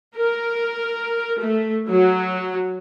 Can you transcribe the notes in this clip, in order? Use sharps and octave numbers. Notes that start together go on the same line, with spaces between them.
A#4
A3
F#3